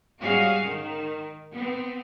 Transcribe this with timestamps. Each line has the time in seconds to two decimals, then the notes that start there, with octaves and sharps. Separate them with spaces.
0.20 G#2 G3 C#4 F#4 G#4 F5
0.64 D#3
1.53 B3 C4